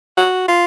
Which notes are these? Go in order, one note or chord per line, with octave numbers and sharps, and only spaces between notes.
F#4
F4